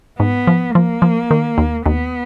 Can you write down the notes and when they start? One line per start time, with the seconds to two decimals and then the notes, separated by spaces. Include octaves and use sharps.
0.19 G#2 B3
0.47 F3
0.75 F3 A#3
1.02 F3
1.31 D#3
1.58 D#2
1.86 D#2 B3